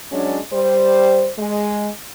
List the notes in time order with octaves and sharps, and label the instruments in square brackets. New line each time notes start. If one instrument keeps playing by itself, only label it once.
[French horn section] F#3 G#3 C#4 D4
G3 C5
G#3